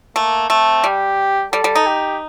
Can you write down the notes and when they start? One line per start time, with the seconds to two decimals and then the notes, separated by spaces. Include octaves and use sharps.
0.16 A3 A#3
0.50 A3 C4
0.84 G3 G4
1.53 G3 A4
1.64 G3
1.75 D#4
1.86 G4